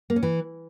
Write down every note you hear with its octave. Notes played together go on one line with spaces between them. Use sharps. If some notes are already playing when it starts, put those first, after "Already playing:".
A#3
C#4
E3